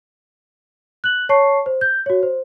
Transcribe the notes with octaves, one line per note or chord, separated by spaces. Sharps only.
F#6 F#7
C#5 A5 C#6 C7
C5
G6
F#4 C#5
C5